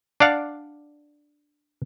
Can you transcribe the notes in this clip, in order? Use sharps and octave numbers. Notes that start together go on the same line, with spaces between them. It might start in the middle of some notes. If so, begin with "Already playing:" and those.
D4 D5 F5 F#5